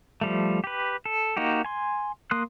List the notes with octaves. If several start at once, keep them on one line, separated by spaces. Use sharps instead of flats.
F3 G3 A3
G4 B4
A4
A#3 D#4 F#4 G4
G#5 C6
A#3 C6 D#6 F#6